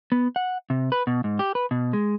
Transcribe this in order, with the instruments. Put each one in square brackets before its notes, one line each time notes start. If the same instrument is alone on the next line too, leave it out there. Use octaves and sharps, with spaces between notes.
[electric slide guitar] B3
F#5
C3
B4
B2
G#2
G4
B4
B2
G#3